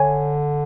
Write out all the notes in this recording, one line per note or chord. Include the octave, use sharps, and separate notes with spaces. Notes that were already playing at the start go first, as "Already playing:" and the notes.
Already playing: D3 C#5 G#5